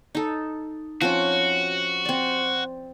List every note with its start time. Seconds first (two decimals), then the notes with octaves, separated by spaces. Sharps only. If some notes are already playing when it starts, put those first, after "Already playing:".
0.15 D#4 A4
1.01 F3 C4 C#4 F#4
2.05 C4 D5